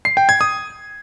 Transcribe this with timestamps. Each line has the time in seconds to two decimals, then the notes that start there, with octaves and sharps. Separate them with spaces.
0.05 C7
0.17 G5
0.29 G#6
0.41 D#6